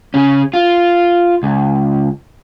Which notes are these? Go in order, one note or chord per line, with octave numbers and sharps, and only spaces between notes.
C#3 C#4
F4
C#2